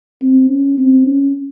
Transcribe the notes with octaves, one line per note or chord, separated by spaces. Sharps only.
C4
C#4
C4
C#4